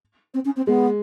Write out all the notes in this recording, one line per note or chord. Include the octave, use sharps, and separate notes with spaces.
C4
C#4
C4
G#3 B3